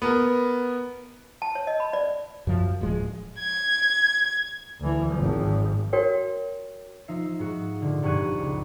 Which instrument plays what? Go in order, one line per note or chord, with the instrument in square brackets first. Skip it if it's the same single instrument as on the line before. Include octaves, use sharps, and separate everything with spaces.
[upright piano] B3 A#4
[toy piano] A5
C#5
D#5
B5
D5
[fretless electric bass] F#2 F3
D1 F3 G#3
[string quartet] G#6
[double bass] D2 E3
G#1 F3
[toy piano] F#4 A#4 C#5 G5
[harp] F3 D#4 E5 C7
G#2 F#4
A#2 D3
F1 G2 C#6 F#6 G#6 D#7
C#2